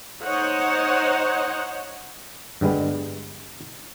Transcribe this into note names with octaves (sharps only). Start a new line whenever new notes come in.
D#4 C5 C#5 D#5 F#5
G2 D3 G3 G#3 B3